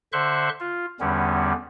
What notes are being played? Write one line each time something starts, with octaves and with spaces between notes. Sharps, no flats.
D3 C5 E5 C6 C#6 F#6
F4
E2 D3 G3 B3 C#4